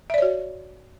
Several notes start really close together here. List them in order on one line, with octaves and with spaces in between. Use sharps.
E5 D5 C#5 F#4